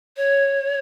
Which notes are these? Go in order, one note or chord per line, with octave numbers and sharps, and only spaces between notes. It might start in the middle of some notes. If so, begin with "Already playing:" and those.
C#5